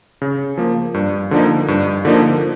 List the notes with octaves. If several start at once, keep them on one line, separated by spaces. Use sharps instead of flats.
C#3
F3 A#3
G2
D3 F3 A#3 D#4
G2
D3 F3 A#3 D#4